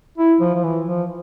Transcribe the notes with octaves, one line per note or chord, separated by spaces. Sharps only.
E4
F3
F3
E3
F3